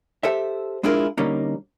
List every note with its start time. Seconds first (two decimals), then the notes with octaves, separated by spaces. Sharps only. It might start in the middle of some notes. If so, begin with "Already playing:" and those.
0.23 G4 A4 C5 E5
0.83 G#3 D4 E4 F4 G#4 A#4
1.17 D3 G3 A#3 C#4 D#4